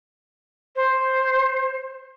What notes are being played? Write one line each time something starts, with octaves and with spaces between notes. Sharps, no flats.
C5